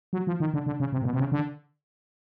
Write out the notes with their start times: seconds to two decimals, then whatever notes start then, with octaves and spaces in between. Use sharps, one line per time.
0.13 F#3
0.27 F3
0.40 D#3
0.54 D3
0.66 D3
0.80 C#3
0.92 C3
1.02 A#2
1.05 B2
1.13 C3
1.20 C#3
1.32 D3